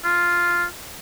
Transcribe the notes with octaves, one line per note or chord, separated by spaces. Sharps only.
F4